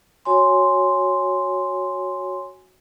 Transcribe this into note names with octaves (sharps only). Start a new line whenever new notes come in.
F#4 C#5 G#5 C6